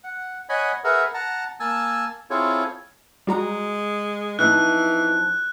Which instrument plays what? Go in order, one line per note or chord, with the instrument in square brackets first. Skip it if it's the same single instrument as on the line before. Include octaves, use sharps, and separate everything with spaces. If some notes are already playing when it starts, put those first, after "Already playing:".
[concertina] F#5
C#5 D#5 F#5 G#5 B5
G#4 A#4 B4 E5 F#5
F#5 A5 A#5
A#3 G#5 A5 E6
C4 E4 F4 G#4 A4 C#5
[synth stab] G3 F#4 A#5 [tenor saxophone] G#3
[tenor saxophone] E3 [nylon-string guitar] F3 C4 D#4 [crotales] F#6